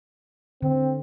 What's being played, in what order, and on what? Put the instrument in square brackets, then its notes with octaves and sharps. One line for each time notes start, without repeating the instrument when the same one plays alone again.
[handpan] D3 [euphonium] C4